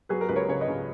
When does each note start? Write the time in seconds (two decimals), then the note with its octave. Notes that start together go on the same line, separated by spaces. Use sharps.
0.09 F#3 G#4 B4
0.21 A#4
0.29 C#2 B4
0.36 A#4 C#5
0.49 C#3 C#5
0.61 B4 D#5
0.68 C#3